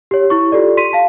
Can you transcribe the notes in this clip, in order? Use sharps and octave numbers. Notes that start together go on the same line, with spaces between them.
G4 C#5
E4 C#6
F4 G4 A4 D5
C6 B6 D#7
F5 A5